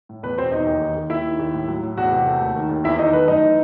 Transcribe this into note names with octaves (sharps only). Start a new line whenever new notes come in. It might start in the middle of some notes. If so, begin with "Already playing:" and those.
A2
E2 B3 B4
B2 C4 C5
E2 D#4 D#5
D#2
D#3
D#2
D#2 E4 E5
D#3
D#2
A2
F#3
A2
E2 F#4 F#5
C3
A3
D#2
D#3
D#2
E2 E4 E5
D#3 D#4 D#5
A3 B3 B4
F#2 D#4 D#5
E3